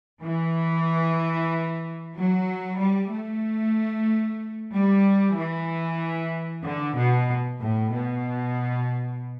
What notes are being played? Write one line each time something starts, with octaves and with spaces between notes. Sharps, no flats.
E3
F#3
G3
A3
G3
E3
D3
B2
A2
B2